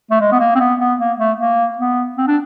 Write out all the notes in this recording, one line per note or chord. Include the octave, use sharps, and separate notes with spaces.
A3
G#3
B3
A#3
C4
B3
B3
A#3
A3
A#3
B3
C4
D4